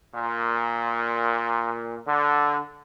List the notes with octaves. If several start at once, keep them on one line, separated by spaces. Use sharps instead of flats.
A#2
D3